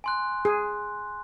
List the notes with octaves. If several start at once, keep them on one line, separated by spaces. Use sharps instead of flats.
G#5 C6 F#6
G#4